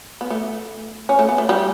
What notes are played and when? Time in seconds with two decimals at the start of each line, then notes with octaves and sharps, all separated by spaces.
0.21 B3
0.30 A3
1.09 C#4
1.19 A3
1.29 B3
1.38 A3
1.49 G3